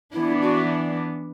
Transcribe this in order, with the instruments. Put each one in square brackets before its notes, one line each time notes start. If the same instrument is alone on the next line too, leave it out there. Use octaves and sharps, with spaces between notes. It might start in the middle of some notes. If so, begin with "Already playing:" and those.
[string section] E3 B3 D4 [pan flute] E4
[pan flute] F#4